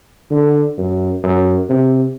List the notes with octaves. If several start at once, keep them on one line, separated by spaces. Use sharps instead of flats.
D3
F#2
F#2
C3